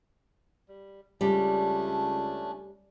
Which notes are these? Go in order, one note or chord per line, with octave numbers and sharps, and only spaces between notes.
G3
C#2 G3 A3 C#4 D4